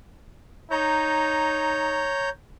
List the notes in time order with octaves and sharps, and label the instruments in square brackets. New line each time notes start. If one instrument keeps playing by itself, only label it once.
[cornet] D#4 [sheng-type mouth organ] C#5 A#5 G6